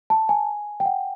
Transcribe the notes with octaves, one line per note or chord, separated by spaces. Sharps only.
A5
G#5
G5
F#5